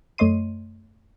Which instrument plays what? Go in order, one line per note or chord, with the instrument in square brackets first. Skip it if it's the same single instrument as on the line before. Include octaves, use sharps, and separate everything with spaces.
[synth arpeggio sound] F#2 A3 C#5 D#5 C6 D#7